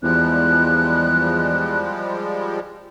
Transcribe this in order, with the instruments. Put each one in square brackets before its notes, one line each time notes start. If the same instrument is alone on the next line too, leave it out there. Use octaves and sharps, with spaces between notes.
[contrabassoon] E2 [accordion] F3 G3 G#3 [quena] F#6